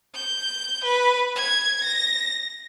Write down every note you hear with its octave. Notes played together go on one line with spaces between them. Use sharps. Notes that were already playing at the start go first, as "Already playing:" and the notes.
G6
B4
G#6
A#6